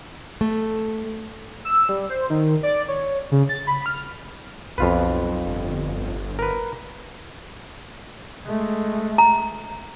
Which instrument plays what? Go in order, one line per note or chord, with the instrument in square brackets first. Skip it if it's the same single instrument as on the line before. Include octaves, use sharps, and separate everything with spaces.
[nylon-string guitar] A3
[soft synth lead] E6
G3
C5
D#3
D5
C#5
C#3
A6
B5
F6
[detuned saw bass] B1 [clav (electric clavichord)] F2 F4 B4
[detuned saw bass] G1
[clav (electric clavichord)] A#4 B4
[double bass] G#3 A3
[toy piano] A#5